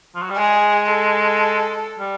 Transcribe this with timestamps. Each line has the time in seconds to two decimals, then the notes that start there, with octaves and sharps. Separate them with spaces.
0.15 F3
0.22 F#3
0.30 G3
0.37 G#3 G#4
0.91 A4
1.99 G3